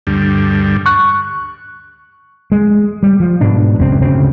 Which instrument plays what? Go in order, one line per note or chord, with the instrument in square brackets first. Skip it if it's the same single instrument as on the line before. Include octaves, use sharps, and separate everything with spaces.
[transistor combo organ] D2 G2
[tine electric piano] C#6 F#6
[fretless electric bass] G#3
G3
F3
G#2 B2 D4
F#1 C#2 F#2 C4
D2 C#3 C4